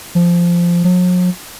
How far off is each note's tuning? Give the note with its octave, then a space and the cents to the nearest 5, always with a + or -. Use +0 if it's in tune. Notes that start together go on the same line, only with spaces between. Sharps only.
F3 -10
F#3 -45